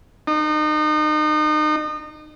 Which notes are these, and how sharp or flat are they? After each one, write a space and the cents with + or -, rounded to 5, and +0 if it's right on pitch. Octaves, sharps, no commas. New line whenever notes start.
D#4 -35